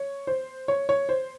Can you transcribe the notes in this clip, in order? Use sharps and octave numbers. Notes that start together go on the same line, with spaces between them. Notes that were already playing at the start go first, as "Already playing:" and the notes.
Already playing: C#5
C5
C#5
C#5
C5